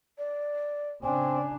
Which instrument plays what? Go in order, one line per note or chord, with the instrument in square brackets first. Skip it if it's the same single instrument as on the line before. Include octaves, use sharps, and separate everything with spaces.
[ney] D5
[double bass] C#3 D4 [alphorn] C4 [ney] G#5